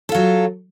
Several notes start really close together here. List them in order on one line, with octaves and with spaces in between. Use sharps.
A4 F4 F#3